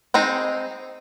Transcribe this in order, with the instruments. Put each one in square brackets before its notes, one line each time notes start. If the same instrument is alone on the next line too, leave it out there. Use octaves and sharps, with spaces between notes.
[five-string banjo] G#3 C4 D#4